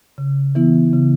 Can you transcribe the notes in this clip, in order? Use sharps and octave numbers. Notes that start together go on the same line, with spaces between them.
C#3
E3 B3 E4
C#3